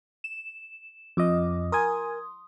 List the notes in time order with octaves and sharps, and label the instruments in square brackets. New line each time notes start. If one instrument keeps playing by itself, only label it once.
[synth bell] E7
[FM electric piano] F2 D#5 [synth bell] F3 F4 D6
[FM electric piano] A#4 G#5 [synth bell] C6 D#6